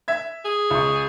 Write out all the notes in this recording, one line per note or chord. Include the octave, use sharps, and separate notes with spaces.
E5 G#6
G#4
C#2 C#6